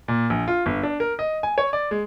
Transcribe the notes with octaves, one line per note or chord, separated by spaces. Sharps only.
A#2
A#1
F4
G1
D4
A#4
D#5
G#5
C#5
D5
G#3